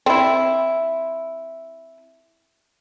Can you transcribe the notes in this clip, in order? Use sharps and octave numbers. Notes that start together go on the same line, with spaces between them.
C4 E4